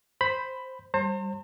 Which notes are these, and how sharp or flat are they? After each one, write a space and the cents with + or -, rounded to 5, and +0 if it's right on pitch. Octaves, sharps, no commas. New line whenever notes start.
C5 +0 B5 +10
G3 +0 C5 +30 A#5 -45